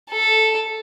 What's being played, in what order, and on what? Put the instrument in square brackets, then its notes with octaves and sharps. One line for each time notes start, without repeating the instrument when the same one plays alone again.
[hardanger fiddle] A4